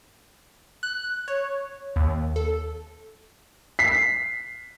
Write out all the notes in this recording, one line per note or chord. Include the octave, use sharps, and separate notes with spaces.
F#6
C#5
D#2
A4
B6 C7